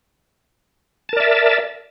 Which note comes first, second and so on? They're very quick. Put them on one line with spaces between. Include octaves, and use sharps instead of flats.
A5 A#4 D5 E5